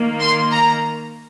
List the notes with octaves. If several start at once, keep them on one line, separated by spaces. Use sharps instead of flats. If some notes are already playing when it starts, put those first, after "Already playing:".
Already playing: D#3 A#3
C6
A#5